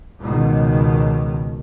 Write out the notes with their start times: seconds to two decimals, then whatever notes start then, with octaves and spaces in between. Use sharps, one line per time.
0.20 C#2 B2 D#3